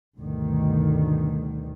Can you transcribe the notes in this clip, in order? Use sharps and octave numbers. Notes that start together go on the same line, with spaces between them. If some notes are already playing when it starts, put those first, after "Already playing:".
D2 G2 B2 D3 D#3